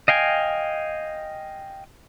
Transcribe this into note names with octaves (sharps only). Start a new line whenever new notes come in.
D#5 F5 G5 G#5